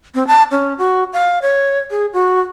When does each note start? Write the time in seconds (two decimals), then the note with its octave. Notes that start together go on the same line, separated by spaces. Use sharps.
0.15 C4
0.27 A5
0.51 C#4
0.78 F#4
1.13 F5
1.42 C#5
1.91 G#4
2.13 F#4